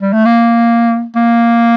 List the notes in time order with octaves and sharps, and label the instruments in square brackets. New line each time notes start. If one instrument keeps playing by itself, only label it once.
[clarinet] G3
A3
A#3
A#3